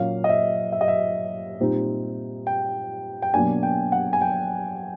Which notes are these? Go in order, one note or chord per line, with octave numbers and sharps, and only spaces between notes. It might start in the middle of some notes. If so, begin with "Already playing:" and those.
Already playing: A#2 F#3 A#3 C#4 F5
D#5
E5
E5
D#5
E5
A#2 G3 C4 D#4
G5
G5
B2 F#3 A#3 D4 G#5
G5
F#5
G#5
G5